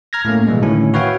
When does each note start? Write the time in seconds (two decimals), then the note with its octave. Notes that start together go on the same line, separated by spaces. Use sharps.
0.13 A#5 F6 G#6 A#6
0.25 A2 A3 A#3 C#4
0.47 B2 E3 G3 G#3
0.62 A2 D3 D#3 C#4 E4
0.94 F#4 B4 C#5 E5 F5 G5